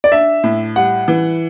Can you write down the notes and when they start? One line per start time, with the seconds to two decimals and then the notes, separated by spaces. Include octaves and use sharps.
0.04 D5
0.12 D4 E5
0.44 A2
0.76 G3 F#5
1.08 E3